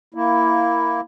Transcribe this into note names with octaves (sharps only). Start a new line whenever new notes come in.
A#3 E4